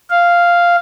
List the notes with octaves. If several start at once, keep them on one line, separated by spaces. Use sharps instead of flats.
F5